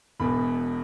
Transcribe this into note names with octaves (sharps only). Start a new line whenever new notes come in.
E1 E2 B2 B5